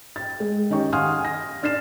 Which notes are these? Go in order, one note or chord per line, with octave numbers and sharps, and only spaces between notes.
G5 A6
G#3
D#3 C#4 D#4 G4 G5 C#6
F5 F#5 G#5 C6 D#6 F6
G#5 A#6
D4 F6 A6 C7 E7